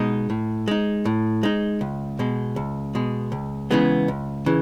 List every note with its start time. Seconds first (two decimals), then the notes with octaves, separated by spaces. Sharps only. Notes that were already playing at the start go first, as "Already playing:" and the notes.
Already playing: B2 G#3 D#4
0.30 A2
0.68 G#3 D#4
1.05 A2
1.43 G#3 D#4
1.81 C#2
2.19 B2 G#3
2.56 C#2
2.95 B2 G#3
3.32 C#2
3.71 C#3 E3 G#3 B3
4.08 C#2
4.46 C#3 E3